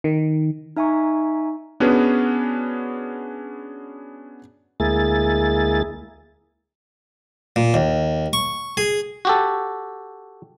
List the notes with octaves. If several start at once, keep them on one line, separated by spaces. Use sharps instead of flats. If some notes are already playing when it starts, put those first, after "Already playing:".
D#3
D#4 E5 G#5 A#5 C#6
B3 C#4 D4 F#4 G#4 B4
D2 G#3 A#3 E4 G#4 A6
A#2
D#2
C#6
G#4
F#4 G4 A4